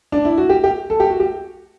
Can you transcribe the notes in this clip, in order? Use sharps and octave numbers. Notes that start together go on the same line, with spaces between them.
D4
E4
F#4
G4
G4
A4
G4
F#4
G4